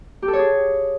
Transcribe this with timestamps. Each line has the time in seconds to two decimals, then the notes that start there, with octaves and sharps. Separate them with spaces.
0.22 G4
0.28 A4
0.33 C#5
0.39 G#4